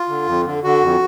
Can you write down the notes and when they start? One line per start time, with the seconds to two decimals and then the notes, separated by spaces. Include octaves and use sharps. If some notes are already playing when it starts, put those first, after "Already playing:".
Already playing: F4
0.09 D3
0.27 F2
0.45 D3
0.64 D3 F#4
0.82 F2